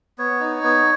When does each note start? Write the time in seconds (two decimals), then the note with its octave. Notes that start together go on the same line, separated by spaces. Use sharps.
0.18 B3 C#5
0.40 D#4
0.63 B3